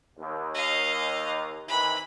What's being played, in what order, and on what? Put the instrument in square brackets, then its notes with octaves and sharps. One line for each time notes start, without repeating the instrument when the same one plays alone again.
[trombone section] D#2
[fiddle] D#5 F5
[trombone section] C3 D#3 E3 [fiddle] B5